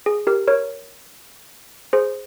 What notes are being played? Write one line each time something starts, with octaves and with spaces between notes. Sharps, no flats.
G#4
G4 A#4
A#4 C#5
G#4 C5